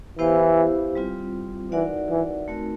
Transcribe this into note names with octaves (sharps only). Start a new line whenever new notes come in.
E3 B3 E4 G4 C5 F5
G3 C4 F4
E3 D#4 F#4 A#4 D5 F#5
E3
A3 C4 D#4 F#4 A#4